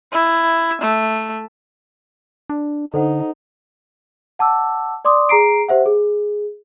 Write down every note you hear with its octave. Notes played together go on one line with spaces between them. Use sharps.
E4
A3
D4
D3 D#4 A4 C5 F#5
F#5 A5 D6 E6
D5 C6 D6 D#6
G#4 A#5 C7 D7
G4 C5 E5 F#5
G#4